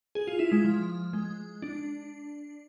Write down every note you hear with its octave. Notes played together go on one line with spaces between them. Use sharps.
G#4
F4
E4
G#3
F3
G#3
D4